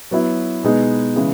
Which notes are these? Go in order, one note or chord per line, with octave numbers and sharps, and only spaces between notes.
F#3 B3 E4
B2 G#3 B3 D#4 G#4
C#3 E3 G#3